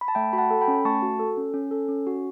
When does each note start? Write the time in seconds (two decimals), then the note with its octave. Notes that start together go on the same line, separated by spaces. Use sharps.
0.01 B5
0.08 A5
0.15 A3 E5 G5
0.33 F#4 B5
0.38 F#5 A5
0.51 A4
0.61 G5 B5
0.68 C#4
0.85 A3 A5 C#6
1.02 F#4
1.20 A4
1.37 C#4
1.54 C#4
1.71 A4
1.89 C#4
2.07 F#4